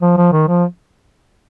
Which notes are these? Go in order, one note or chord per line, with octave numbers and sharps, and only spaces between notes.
F3
F3
D#3
F3